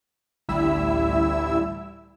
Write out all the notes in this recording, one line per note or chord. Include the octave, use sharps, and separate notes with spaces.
A1 D2 G3 E4 E5 E6